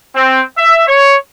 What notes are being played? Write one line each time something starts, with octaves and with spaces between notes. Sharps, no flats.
C4
E5
C#5